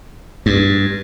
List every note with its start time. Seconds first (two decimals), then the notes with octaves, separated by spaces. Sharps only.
0.46 G2